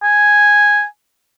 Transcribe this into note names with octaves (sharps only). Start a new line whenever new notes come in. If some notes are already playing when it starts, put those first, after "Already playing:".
G#5